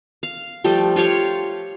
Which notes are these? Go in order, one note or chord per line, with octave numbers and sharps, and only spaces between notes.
F5
F3 G3 A3 G4
F4 G4 C#5 F5